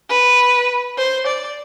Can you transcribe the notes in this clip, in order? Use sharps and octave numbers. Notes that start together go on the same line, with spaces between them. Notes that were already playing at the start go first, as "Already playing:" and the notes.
B4
C5
D5